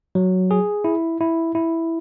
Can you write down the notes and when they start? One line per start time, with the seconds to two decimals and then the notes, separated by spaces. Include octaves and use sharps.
0.15 F#3
0.51 G#4
0.84 E4
1.21 E4
1.55 E4